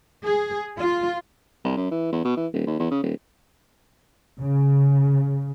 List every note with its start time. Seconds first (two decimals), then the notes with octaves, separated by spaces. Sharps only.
0.25 G#4
0.78 F4
1.64 C2
1.77 F#2
1.91 E3
2.12 E2
2.24 B2
2.37 E3
2.53 D#1
2.67 D#2
2.79 E2
2.91 C#3
3.03 D#1
4.40 C#3